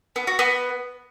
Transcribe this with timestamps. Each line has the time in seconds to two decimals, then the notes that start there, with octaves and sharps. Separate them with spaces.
0.16 B3
0.27 F#4
0.39 B3